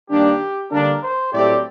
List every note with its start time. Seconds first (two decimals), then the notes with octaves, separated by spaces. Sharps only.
0.10 G2 D#3 G3 A#3 D4 G4
0.71 D3 G3 A#3 D4 A#4
1.02 C5
1.33 A2 F#3 A3 C4 G4 D5